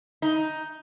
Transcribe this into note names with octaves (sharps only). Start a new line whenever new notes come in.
D#4